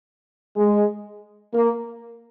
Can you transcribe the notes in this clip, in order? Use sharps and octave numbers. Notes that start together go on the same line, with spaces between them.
G#3
A#3